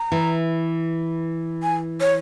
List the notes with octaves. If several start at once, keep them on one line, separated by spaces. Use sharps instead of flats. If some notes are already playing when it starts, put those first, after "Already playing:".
Already playing: A#5
E3
G#5
C#5